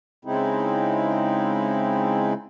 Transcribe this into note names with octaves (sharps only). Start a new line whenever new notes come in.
C#3 G#3 C4 D#4 E4